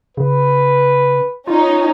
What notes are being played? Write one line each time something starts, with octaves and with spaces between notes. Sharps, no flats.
C#3 B4
C#4 D#4 F4